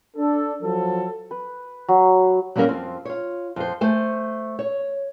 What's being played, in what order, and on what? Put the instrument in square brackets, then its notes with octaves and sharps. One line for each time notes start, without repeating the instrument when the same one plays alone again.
[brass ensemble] D4 A4
F3 F#3 A4
[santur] B4
F#3
[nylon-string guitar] F#3 G3 A#3 C#4 A#4
F2 C4
F4 C#5
F2 C5
A3 C5 G#5
C#5